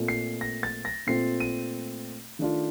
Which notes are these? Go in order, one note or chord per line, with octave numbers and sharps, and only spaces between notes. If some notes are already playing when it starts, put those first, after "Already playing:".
Already playing: A#2 A3 C4 F4
C7
A#6
A6
A#6
A#2 A3 C4 F4 C7
D#7
D#3 A3 D4 F4